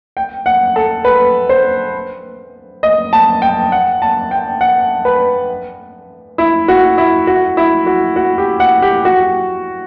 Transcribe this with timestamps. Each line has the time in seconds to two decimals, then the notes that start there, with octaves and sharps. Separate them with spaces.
0.17 G5
0.46 F#5
0.76 A4
1.05 B4
1.49 C5
2.83 D#5
3.13 A5
3.42 G5
3.72 F#5
4.02 A5
4.31 G5
4.61 F#5
5.05 B4
6.38 E4
6.68 F#4
6.98 E4
7.27 F#4
7.57 E4
7.86 F#4
8.16 F#4
8.38 G4
8.60 F#5
8.82 G4
9.05 F#4